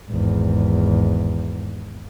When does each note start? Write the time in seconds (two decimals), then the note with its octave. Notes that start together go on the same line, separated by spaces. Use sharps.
0.10 G#1 E2